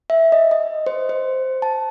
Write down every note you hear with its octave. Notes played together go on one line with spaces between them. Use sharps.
E5
D#5
D#5
C5
C5
A5